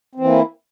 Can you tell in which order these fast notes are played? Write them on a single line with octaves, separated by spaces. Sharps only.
C4 E3 A#3 E4